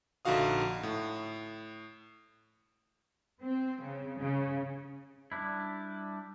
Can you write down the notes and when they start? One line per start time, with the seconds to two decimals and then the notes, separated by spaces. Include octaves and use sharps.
0.25 A#1 D3 D#4 F#4 F5 D#6
0.83 A2
3.41 C4
3.81 C#3
4.18 C#3
5.32 G3 D4 E4